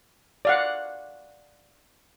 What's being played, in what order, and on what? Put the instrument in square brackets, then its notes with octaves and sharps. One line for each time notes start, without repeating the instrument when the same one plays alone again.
[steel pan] D5 F5 F#5